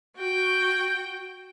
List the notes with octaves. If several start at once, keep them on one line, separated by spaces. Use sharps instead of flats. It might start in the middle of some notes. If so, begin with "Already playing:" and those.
F#4 G5